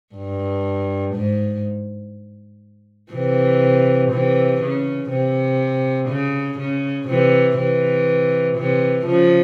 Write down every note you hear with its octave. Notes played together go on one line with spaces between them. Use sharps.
G2
G#2
C3 E3
C3 E3
C#3
C3
C#3
C#3
C3 E3
C3 E3
C3 E3
C#3 F3